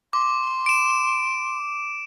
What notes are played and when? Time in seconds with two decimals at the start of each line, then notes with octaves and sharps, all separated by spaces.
0.13 C6 D6
0.66 D7 E7